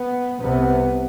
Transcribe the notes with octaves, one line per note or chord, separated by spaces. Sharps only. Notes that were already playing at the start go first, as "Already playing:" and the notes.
Already playing: B3
C2 C3 B3